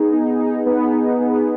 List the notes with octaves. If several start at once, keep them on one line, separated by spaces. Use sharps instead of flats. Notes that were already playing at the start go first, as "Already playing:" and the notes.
Already playing: B3 D#4 G#4
D#4
D#4
B3
D#4
B3